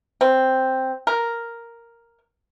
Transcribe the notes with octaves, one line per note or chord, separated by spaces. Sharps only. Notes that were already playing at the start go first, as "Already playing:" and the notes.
C4
A#4